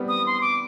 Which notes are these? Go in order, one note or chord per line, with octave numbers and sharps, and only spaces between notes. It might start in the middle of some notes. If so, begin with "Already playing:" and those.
Already playing: G3 B3 C4
D#6
C6
D6